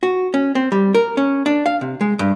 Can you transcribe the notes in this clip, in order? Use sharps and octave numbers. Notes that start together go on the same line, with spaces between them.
F#4
C#4
C4
G3
A#4
C#4
D4
F5
C3
G#3
G2